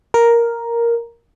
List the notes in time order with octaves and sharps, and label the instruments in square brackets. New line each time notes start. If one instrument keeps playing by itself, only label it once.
[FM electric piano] A#4